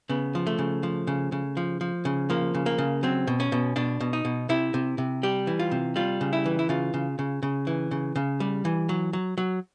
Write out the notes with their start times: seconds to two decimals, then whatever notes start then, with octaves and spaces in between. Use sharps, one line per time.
0.09 C#3 B3
0.35 F3
0.47 A3
0.59 C#3
0.83 F3
1.07 C#3
1.32 C#3
1.57 F3
1.81 F3
2.05 C#3
2.30 F3 A#3
2.55 C#3
2.66 A#3
2.78 C#3
3.03 F#3 C4
3.27 B2
3.40 C#4
3.52 B2
3.76 B2 D4
4.00 B2
4.13 D#4
4.25 B2
4.49 C3 E4
4.74 C3
4.98 C3
5.23 G3 G4
5.47 E3
5.59 F4
5.71 C3
5.96 G3 F4
6.21 C#3
6.33 E4
6.46 E3
6.59 E4
6.69 C#3 F4
6.94 C#3
7.19 C#3
7.43 C#3
7.67 E3
7.91 C#3
8.16 C#3
8.40 G3
8.65 E3
8.89 F#3
9.13 F#3
9.38 F#3